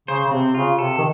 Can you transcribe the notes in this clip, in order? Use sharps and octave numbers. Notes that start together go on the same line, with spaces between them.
C#3 C5
C#3
C3 C4
C#3 F4
C3 A4
D#3